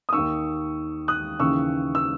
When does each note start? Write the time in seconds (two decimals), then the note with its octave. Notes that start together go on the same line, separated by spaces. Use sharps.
0.09 D#6
0.13 D#2 D#3 C#6 E6
1.08 D#6 F#6
1.39 D#2 C#3 E3 C#6 E6
1.95 E6